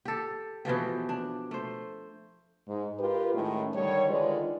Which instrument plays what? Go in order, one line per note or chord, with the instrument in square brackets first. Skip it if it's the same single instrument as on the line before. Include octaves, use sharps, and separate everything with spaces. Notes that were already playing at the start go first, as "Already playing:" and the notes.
[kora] G4 A4
B2 E3 F3 G4
D4
A3 C5
[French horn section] G#2
F4 G4 A#4 B4
A2 D#3 G#3 C#4
D3 D#3 G3 C#5
D3 D#3 G#3 F4 B4 D5